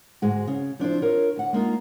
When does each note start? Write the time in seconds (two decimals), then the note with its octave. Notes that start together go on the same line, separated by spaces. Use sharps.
0.22 D2 G#2 G#3 F#4
0.47 C#3
0.79 F3 D4 E4 C5
1.01 F4 A#4 C#5
1.36 D2 F#5
1.53 G#3 A#3 D#4 F4